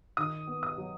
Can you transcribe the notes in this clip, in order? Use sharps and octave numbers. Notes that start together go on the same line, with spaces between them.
D#3 D#6
B3
D#6
F#3